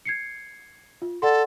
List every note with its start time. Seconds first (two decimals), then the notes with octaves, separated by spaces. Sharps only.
0.05 G#6 C7 C#7
1.02 F4
1.22 A4 D5 F#5 C6